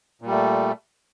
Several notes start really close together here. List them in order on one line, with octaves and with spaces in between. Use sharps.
A#2 G3 A3